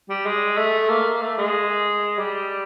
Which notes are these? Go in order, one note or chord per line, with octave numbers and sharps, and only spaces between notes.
G3
G#3
A3
A#3
A3
G#3
G3